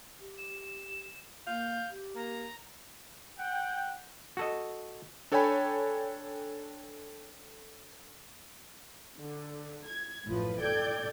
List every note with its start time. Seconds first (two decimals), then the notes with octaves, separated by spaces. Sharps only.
0.20 G4
0.38 E7
1.47 A#3 F5 G6
1.91 G4
2.15 A#3 A#5
3.39 F#5 G5
4.37 F#4 A4 D#5
5.32 D4 A4 C#5 G5 G#5 B5
9.19 D3
9.87 G#6
10.27 A1 F#2 A2 F3 B4
10.62 A4 D5 G5 G6 G#6